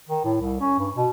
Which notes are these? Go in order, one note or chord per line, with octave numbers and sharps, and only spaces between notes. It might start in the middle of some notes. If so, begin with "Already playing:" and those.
D#3
A2
C2
C#4
G2
B2